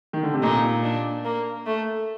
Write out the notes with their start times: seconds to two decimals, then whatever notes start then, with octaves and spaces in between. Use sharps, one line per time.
0.13 D#3
0.23 D3
0.34 C3
0.42 A#2 D#4
0.84 D4
1.25 A#3
1.66 A3